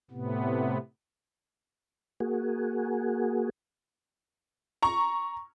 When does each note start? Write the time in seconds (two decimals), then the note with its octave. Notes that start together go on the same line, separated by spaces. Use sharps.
0.11 A2 C3 B3
2.20 A#3 F#4 G#4
4.83 A#5 C#6